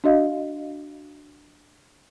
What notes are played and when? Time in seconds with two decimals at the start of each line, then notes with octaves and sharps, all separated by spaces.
0.04 D4 F#4 D#5 F5